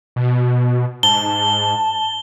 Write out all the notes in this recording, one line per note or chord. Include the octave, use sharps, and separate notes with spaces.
B2
G#2 A5 G7